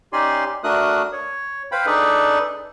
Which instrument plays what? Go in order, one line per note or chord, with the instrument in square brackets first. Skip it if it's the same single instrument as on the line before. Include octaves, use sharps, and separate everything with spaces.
[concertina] C#4 D#4 G4 D5 G#5 C6
A3 D4 F#4 A#4 D#6 F#6
C#5
B4 C5 F5 G5 B5
D4 D#4 G#4 A4 B4 D5